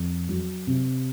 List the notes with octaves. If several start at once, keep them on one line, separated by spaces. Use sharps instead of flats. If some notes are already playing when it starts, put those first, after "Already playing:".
Already playing: F2
F#3
C3